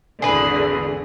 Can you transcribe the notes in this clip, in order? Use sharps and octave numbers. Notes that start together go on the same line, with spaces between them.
G#1 E2 D3 G#4 B4